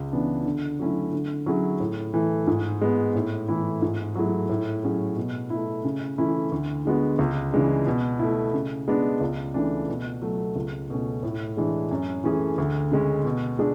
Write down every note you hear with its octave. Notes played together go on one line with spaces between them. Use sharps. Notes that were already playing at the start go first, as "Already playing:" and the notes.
Already playing: C#2
C#3 E3 B3 D4
D3
F#3 A3 C#4 E4
D3
F#3 C#4 E4 G#4
A2
E3 A3
G#2
G#3 B3
A2
E3 A3 E4
G#2
F#3 A3 E4 G#4
A2
F#3 C#4 G#4
B2
A3 E4
C#3
E3 A3 C#4 E4
D2
D3 G#3 B3 F#4
C#2
C#3 E3 G#3 D4
B2
A3 E4
C#3
G#3 B3 D4
C#2
C#3 E3 A3 D4
B2
F#3 A3
C#2
B2 A3 C#4
A2
E3 G#3 D4
F#2
E3 A3 C#4 G#4
D2
C#3 G#3 C#4
B2
G#3 D4 G#4